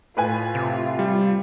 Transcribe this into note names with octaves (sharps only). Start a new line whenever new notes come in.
A2 F4 B4 G#5
C3
G3